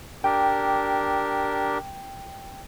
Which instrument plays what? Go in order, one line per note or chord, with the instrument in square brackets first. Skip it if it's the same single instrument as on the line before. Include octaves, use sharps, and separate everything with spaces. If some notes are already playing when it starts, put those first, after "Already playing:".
[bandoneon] D4 G4 A#4 [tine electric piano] G5